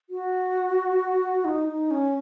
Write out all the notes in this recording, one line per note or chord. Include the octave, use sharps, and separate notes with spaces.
F#4
D#4
D#4
C#4